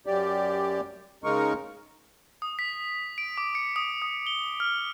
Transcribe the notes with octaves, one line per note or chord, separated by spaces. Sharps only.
F#2 G4 D5
C#3 G#3 D#4 A#4 C#6
D#6
B6
D7
D6
C#7
D#6
D#6
G7
F6